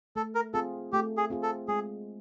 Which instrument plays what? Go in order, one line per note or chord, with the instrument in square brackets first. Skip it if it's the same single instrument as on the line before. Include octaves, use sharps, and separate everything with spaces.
[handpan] A3 [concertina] A4
[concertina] A#4
[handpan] C4 F4 G#4 [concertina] A4
[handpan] A3 [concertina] G4
[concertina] G#4
[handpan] C4 F4 G#4
[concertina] A4
[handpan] G#3 [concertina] G#4